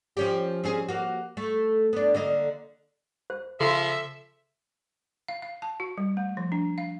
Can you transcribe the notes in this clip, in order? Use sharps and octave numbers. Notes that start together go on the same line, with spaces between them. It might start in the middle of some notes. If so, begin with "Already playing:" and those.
F3 C#4 G4
C4 C#4 G#4
A#3 F#4
A3
B3 D4
D3 A#3 D#5
C5
C#3 F3 A4 E5 C6
F5
F5
A5
F#4
G3
A3
F3
D4
F5